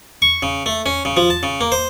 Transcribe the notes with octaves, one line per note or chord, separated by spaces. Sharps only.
C#6
C#3
A3
C#4
C#3
F3
A5
C#3
A#3
C5